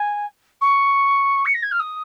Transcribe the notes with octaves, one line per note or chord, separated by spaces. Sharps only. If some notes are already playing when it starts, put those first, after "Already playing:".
Already playing: G#5
C#6
C#7
A#6
G#6
F6
D#6